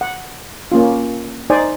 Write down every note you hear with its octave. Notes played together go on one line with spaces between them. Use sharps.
F#5
A#3 C#4 F4
D#4 C5 D5 G#5